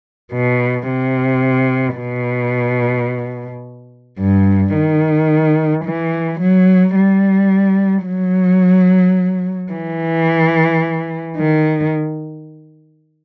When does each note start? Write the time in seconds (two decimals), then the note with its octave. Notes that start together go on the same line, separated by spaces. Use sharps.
0.33 B2
0.88 C3
1.98 B2
4.20 G2
4.75 D#3
5.85 E3
6.41 F#3
6.95 G3
8.06 F#3
9.72 E3
11.37 D#3